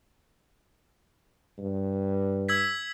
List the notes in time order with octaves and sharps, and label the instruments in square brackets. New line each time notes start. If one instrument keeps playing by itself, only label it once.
[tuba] G2
[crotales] E6 G#6 B6